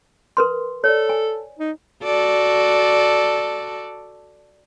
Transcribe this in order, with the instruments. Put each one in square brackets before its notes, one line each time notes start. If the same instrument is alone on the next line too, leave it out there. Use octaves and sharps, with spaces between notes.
[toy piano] A#4 B4 C6
[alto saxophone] A4 [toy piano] C#5 D5
[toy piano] G#5
[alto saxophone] D#4
[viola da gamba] F#4 A4 D5